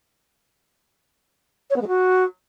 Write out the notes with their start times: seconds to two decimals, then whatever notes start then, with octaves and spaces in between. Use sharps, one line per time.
1.70 C#5
1.76 B3
1.81 G#3
1.87 F#4